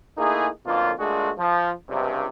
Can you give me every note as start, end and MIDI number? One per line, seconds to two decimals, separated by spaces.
0.17 0.48 57
0.17 0.48 58
0.17 0.48 63
0.17 0.48 64
0.17 0.48 68
0.66 0.92 35
0.66 0.92 41
0.66 0.92 50
0.66 0.92 58
0.66 0.92 65
0.99 1.30 46
0.99 1.30 56
0.99 1.30 57
0.99 1.30 62
0.99 1.30 66
0.99 1.30 68
1.38 1.70 53
1.89 2.26 37
1.89 2.26 43
1.89 2.26 48